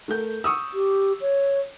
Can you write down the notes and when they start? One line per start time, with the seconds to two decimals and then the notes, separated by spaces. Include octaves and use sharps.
0.08 A3 A#4 G6
0.44 C#6 D#6 E6
0.74 G4
1.21 C#5